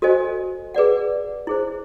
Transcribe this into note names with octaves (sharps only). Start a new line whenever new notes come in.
F#4 A4 C5 D#5 G#5
G#4 B4 D5 F#5
E4 G#4 C5